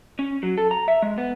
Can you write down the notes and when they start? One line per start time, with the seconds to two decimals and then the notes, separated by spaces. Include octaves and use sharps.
0.19 C#4
0.43 F#3
0.58 A4
0.71 A#5
0.88 E5
1.02 G#3
1.18 B3